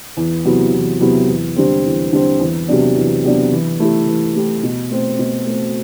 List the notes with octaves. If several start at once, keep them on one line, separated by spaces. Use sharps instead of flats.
E2
C3 F#3 B3 E4
E2
C3 F#3 B3 E4
E2
D3 G3 C4
E2
D3 G3 C4
E2
C3 F#3 B3 D4
E2
C3 F#3 B3 D4
E3
A3 E4 G4
E3
A3 E4 G4
B2
A3 C4
B2
A3 C4